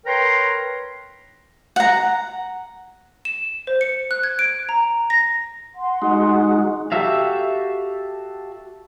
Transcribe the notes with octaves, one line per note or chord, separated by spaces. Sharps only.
A#4 B4 C#5 G5 A#5 C6
F#5 A#5
E7
C5
C#7
F#6
G#6
D7
A#5
A#6
F#5 C6
G#3 D#4 F#4
F#4 G4 A4 E5 F5